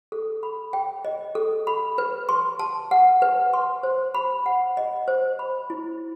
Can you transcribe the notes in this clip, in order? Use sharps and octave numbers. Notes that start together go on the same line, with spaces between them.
A4
B5
G5
D#5
A4
B5
B4
C6
A5
F#5
B4
C6
C5
B5
F#5
D#5
C5
B5
E4